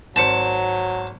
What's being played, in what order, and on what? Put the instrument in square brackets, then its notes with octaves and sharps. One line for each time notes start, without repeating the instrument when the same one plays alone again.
[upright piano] G#1 C5 C#7 [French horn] F#3 [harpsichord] A5